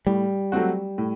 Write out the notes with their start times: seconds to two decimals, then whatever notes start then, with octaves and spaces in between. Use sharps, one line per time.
0.06 A2 G3
0.52 F#3 A3 C4 F#4
0.98 A2